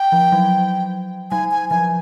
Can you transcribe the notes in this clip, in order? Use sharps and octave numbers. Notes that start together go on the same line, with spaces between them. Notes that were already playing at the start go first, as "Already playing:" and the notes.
Already playing: G5
F3
F#3
F#3 G#5
G#5
F3 G#5